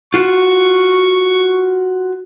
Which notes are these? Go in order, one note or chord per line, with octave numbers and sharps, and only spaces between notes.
F4 F#4 C#6